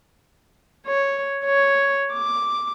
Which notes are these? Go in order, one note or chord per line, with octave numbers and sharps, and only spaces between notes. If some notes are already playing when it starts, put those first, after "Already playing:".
C#5
C#5
D6